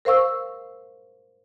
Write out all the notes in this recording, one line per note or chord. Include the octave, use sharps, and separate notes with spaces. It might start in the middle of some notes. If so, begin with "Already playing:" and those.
A#4 C5 F5 C#6 E6